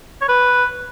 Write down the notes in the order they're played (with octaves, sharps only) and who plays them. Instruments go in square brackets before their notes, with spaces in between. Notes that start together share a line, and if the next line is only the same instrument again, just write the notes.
[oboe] C#5
B4